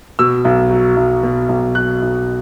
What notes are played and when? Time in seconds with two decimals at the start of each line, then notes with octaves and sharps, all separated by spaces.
0.19 B2 E6
0.45 B1
0.70 F#3
0.97 B1
1.23 B2
1.49 B1
1.75 F#3 F#6
2.02 B1